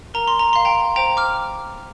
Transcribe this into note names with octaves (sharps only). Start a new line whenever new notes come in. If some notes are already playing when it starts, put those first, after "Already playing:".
A#4 A#5
C6
A#5
F5 C6
G5 A#5
C5 G5 A#5
D6 F6